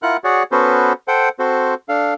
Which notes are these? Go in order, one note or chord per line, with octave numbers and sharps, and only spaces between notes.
E4 F4 A#4 F#5 F#6
F#4 G#4 C#5 D5 F#5
B3 C#4 F#4 A4 B4 C5
A4 C5 F#5 G5
C4 F#4 A4 C5
D4 A4 F5